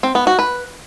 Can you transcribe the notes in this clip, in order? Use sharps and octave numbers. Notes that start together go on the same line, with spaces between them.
C4
B3
F#4
B4